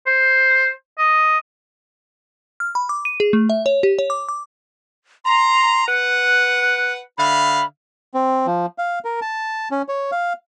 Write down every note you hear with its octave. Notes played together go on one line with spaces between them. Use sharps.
C5
D#5
F6
B5
D6
D#7
G#4
A3
E5
C#5
G4
C#5
D6
D6
A#5 C6
B4 F#5 F#6
D3 E5 F5 B5
C4
F3
F5
A#4
A5
C#4
C#5
F5